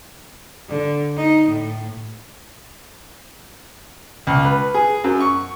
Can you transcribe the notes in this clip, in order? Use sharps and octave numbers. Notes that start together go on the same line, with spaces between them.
D3
D#4
A2
C#2
B4
G#4
F#2
C#6